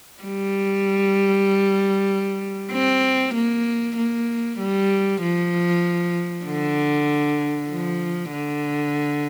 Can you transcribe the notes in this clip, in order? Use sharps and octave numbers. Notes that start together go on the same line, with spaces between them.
G3
C4
A#3
A#3
G3
F3
D3
F3
D3